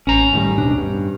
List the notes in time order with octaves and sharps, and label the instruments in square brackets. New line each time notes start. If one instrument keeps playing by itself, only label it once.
[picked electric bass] A1 [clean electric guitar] C#4 A#5
[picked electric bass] A2 D#3 G3
D1 B2 D4
G2